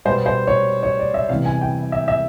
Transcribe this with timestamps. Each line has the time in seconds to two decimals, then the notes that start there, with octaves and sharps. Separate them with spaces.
0.05 B2 G3 B3 C5
0.26 C5
0.47 C#5
0.83 C#5
0.99 D5
1.14 E5
1.29 C3 E3 G3 B3 F5
1.46 G#5
1.61 G5
1.92 E5
2.08 E5